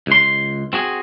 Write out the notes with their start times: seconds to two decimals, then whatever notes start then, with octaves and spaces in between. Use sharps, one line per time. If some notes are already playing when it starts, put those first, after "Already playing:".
0.07 C#2 C6
0.73 C4 F#4 G#4